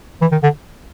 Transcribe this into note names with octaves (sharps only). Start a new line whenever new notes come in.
E3
D#3
D3